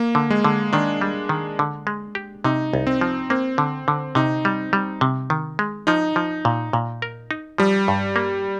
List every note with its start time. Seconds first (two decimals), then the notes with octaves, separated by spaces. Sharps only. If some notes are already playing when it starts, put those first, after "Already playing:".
Already playing: A#3
0.15 D3
0.30 G#3
0.44 D3
0.73 D#3 D4
1.01 G3
1.29 D#3
1.59 D3
1.87 G#3
2.15 G4
2.44 C3 D#4
2.73 C2
2.87 C4
3.01 F3
3.30 A#3 C4
3.58 D3
3.88 D3
4.15 C3 D#4
4.45 G3
4.73 G3
5.01 C3
5.30 D#3
5.59 G#3
5.87 F3 D#4
6.16 F3
6.45 A#2
6.73 A#2
7.02 A#4
7.31 D#4
7.58 F3 G3
7.88 G2
8.16 A#3